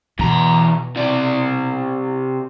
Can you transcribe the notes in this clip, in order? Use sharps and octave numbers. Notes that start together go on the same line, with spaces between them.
E2 B2 A#5
C3 D5